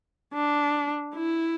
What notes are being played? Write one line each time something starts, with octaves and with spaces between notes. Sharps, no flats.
D4
E4